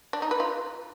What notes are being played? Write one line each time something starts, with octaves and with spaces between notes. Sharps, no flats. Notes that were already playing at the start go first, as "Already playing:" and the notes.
D4
D#4
B4
F4